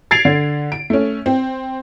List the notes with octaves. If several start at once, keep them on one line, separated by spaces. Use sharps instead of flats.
G#6 A6 C7 D7 F7
D3
D7
A3 C#4
C4